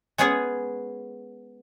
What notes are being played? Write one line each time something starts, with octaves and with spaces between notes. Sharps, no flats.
G#3 B3 C#4 G#4 B4